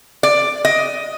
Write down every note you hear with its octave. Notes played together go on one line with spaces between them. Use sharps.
D5
D#5